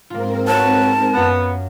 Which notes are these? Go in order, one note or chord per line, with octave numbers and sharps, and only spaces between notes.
G#2 A#3 C4 F4 A#4
F#4 B4 C#5 A5
F#2 B3 F4 A6